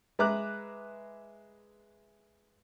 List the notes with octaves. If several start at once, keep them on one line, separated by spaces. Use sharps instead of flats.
G#3 B4 E5 A#5 D6 F#6